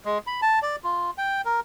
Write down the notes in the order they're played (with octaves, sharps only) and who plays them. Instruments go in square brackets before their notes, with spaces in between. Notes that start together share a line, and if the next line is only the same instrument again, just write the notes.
[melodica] G#3
B5
A5
D5
F4
G5
A#4